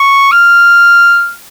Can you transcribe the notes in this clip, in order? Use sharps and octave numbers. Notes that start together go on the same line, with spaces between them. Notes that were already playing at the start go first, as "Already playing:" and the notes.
Already playing: C#6
F6